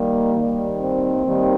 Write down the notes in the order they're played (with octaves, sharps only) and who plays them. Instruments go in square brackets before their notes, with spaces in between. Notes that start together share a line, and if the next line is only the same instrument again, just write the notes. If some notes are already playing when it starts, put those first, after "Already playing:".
Already playing: [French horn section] D#2 D#3 G3 A#3
D#2 D#3 G3
C4
D#2 D#3 G3